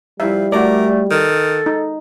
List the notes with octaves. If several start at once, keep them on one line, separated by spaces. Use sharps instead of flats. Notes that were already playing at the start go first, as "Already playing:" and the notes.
F3 G3 E4 E5
A3 F#4 A#4 D5
D#3 A4
D#4